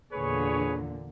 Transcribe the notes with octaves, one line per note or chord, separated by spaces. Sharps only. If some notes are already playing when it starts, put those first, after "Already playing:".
E2 A#2 D3 G#4 B4 C#5